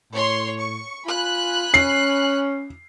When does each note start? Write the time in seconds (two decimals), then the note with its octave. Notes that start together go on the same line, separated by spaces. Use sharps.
0.12 A2 C#5 C6
0.58 C#6
1.06 F4 G#5 B5 F#6
1.74 C#4 C7